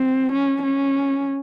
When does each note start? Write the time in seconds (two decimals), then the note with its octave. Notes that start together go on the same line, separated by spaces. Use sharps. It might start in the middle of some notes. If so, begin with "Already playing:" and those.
Already playing: C4
0.32 C#4
0.62 C#4